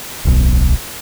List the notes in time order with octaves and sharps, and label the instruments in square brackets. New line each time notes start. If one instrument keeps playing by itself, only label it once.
[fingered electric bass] D1 B1